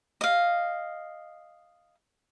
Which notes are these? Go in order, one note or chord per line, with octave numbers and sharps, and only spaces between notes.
D#5 F5